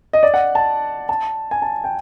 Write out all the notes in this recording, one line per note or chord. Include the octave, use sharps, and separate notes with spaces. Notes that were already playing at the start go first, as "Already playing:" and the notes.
D#5
D5
F#5
A5
A5
G#5
A5
G5